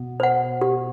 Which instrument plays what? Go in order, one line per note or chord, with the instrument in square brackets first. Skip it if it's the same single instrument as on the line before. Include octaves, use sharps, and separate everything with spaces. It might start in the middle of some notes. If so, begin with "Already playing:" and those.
Already playing: [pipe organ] B2 B3
[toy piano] C5 F#5
G4